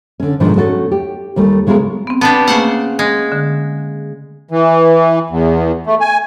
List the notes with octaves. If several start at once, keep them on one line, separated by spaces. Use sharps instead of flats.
D3 C#4
G#2 B2 D#3 F3 B3 D4
A3 C#4 F#4 A4
G4
D#2 G3 A3
C#3 G#3 B3 F#4 A#4
B3 C4
B3 D4 G4 A5
C#3 A3 A#3 C5 F#5
G#3
D3
E3
E2
A3
G#5